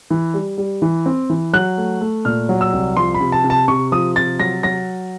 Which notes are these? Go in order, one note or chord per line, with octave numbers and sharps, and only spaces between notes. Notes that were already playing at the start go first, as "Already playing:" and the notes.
E3
G3
G3
E3
C4
E3
F#3 F#6
A3
A3
A#2 F6
F#3
E6
C2
F3 C6
B5
C3
A5
C3
A5
C3 C#6
F3 D#6
C3 A6
F#3 A#6
F#3 A#6